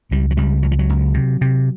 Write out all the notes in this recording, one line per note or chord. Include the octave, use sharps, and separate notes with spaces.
C#2 G3
F#3
C#2 G3
C#2 F#3
F3
F#3
C#2
C3
C3